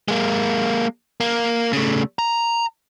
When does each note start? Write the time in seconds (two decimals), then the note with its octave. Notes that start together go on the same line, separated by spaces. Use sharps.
0.08 G#3 A#3
1.20 A#3
1.73 C#3 A3
2.19 A#5